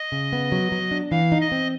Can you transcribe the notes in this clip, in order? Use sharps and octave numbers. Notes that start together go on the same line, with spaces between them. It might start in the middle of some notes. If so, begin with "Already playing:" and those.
Already playing: D#5
C#3
B3
F#3
F#3
D4
E3 F5
D#4
D#5
C4